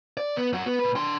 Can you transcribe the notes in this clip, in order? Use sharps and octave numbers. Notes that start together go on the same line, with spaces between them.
D5
B3
F#2 F#4
B3
A#2 B4
D4 C6